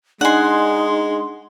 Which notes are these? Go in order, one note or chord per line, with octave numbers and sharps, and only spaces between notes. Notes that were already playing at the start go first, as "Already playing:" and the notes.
G#3 D4 D#4 F#5 G#5 C6